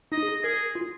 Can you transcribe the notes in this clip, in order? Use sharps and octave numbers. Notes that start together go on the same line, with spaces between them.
D#4 D#5
G#4
G#4 A#4
F4